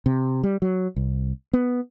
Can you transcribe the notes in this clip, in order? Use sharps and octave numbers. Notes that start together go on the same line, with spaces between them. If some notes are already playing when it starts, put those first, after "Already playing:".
C3
G3
F#3
C2
B3